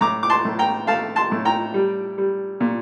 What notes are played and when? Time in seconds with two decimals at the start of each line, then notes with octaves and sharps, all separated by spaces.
0.01 A2 A#5 D6
0.23 D6
0.30 A5 C6
0.45 A2
0.59 G5 A#5
0.87 A3 F5 A5
1.16 A5 C6
1.31 A2
1.45 G5 A#5
1.74 G3
2.18 G3
2.60 A#2